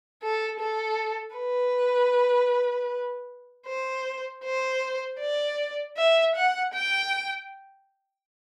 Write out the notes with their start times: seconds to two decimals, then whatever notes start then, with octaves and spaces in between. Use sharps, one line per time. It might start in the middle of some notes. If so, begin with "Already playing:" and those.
0.23 A4
0.60 A4
1.36 B4
3.67 C5
4.44 C5
5.20 D5
5.97 E5
6.36 F#5
6.74 G5